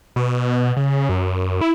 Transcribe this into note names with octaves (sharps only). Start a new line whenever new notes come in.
B2
C#3
F#2
E4